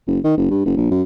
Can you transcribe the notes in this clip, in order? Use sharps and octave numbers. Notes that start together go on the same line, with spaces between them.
F#1
D#3
F#1
G2
F#1
A#1
F#2